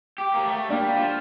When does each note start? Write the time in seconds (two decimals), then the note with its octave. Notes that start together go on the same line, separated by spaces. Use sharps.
0.18 G4
0.34 A#3
0.45 A3
0.70 G3 A#3 D4
0.96 F3